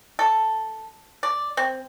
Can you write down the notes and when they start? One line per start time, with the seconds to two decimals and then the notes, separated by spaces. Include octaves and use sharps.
0.19 A4
1.23 D5
1.57 C4